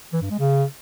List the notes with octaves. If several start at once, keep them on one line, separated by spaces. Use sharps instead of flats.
E3
G2
G#3
C#3